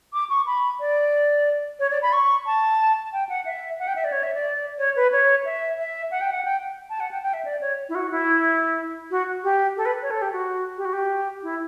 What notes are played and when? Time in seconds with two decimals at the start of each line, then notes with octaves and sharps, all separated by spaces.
0.13 D6
0.30 C#6
0.46 B5
0.80 D5
1.79 C#5
1.91 D5
2.02 B5
2.13 C#6
2.46 A5
3.12 G5
3.29 F#5
3.45 E5
3.79 F#5
3.87 G5
3.96 E5
4.04 D5
4.12 C#5
4.23 E5
4.34 D5
4.78 C#5
4.96 B4
5.12 C#5
5.45 E5
5.78 E5
6.11 F#5
6.21 G5
6.31 F#5
6.45 G5
6.90 A5
7.00 F#5
7.11 G5
7.22 G5
7.33 E5
7.45 D5
7.61 C#5
7.89 E4
7.95 F#4
8.11 E4
9.10 F#4
9.43 G4
9.77 A4
9.85 B4
10.02 C#5
10.10 A4
10.22 G4
10.32 F#4
10.77 G4
10.85 F#4
10.93 G4
11.43 E4